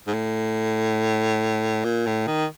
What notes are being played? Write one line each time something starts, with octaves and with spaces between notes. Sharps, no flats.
G#2
A2
A#2
A2
D#3